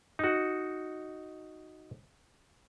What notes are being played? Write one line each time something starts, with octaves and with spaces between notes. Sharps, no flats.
D#4 F#4